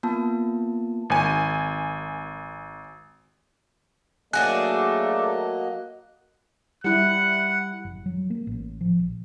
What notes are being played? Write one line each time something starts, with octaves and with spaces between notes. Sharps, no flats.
A#3 B3 F4 A5
G#1 G#5
F#3 A3 A#3 D4 F#4 G#4 D#5 F#6
G3 E4 F#5 F#6
F#1
F#3
A#3
A1
F3
A#1